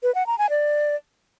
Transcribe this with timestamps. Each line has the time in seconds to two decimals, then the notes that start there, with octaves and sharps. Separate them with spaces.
0.03 B4
0.15 F#5
0.27 A#5
0.38 G#5
0.50 D5